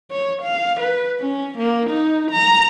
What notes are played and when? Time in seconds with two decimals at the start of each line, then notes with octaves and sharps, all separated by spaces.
0.11 C#5
0.42 F5
0.80 B4
1.20 C#4
1.58 A#3
1.90 D#4
2.32 A#5